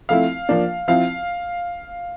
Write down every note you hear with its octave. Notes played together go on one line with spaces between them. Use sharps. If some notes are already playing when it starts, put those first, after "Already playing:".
F3 A3 C4 E4 F5
F3 A#3 D4
F3 C4 E4 F5